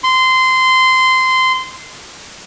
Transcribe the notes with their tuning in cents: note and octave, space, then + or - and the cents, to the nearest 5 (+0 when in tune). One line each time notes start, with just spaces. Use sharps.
C6 -15